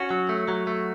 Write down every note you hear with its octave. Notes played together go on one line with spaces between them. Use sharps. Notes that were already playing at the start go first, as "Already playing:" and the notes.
Already playing: C#4 F#4
F#3
A3
F#3
A3